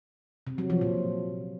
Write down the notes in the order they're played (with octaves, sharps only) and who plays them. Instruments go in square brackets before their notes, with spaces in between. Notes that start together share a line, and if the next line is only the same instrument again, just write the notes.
[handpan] C3
F#3
F3
A#2